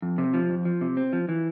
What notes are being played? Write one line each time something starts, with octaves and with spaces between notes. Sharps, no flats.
F2
C3
F3
F2
F3
C3
C4
F3
E3